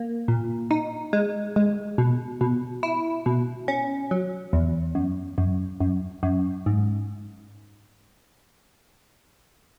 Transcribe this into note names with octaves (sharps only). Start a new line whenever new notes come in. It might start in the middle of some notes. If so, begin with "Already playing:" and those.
Already playing: A#3
A#2
D#4
G#3
G#3
B2
B2
E4
B2
C#4
F#3
E2
F#2
F#2
F#2
F#2
G#2